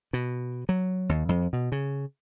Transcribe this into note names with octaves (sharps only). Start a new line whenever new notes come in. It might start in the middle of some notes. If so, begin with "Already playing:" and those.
B2
F#3
D#2
F2
B2
C#3